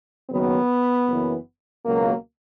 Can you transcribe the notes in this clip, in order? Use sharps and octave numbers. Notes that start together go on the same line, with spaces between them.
F#1 F#2 D#3 F#3 B3
F#1 F#2 E3
C#2 B2 F#3 A#3